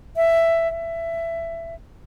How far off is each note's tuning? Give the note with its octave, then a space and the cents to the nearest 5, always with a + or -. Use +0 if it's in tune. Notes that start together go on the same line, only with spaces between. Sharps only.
E5 +10
E5 +15